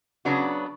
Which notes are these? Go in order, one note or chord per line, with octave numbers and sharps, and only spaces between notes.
C#3 F#3 B3 D4 F#4